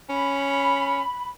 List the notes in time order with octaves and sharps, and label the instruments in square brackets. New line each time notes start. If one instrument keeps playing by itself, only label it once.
[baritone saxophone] C#4 [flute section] B5